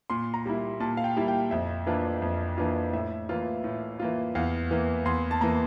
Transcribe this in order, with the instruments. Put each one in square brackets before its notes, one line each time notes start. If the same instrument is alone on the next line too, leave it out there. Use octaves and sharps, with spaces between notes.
[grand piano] A#2 C6
A#5
G3 A#3 E4
A#2 A5
F5
G5
G3 A#3 E4
G5
F2 E5
E3 A#3 D4 F4
F2
E3 A#3 D4 F4
A2 E5
E3 A#3 F4
A2
E3 A#3 F4
E2 F5
E3 A#3
E2 C6
A5
E3 A#3 A#5